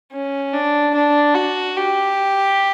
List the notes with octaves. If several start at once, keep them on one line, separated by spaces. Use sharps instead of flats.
C#4
D4
D4
F#4
G4